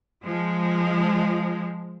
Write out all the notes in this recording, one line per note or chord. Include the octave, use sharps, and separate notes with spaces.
F3 G#3